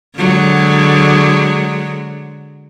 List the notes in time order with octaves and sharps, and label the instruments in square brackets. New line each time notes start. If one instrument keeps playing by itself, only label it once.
[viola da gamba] D3 F#3 G#3